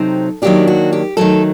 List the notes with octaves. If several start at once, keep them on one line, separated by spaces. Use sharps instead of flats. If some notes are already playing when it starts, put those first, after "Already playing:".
Already playing: C3 F#3 C4 D#4 A4
D#3 F#3 A#3 D4 G4
F#4
G4
D#3 F#3 A3 A4